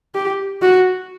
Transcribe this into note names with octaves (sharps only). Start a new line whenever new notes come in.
G4
F#4